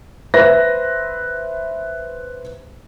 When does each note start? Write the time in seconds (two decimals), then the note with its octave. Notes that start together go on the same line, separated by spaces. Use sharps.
0.34 B4 C5 E5 A#6